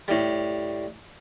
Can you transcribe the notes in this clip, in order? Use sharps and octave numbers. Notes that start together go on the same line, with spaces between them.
A2 G3